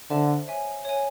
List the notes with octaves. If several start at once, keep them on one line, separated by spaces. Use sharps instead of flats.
D3 C5 E5 A5
C#5 E5 G#5
C#5 E5 G#5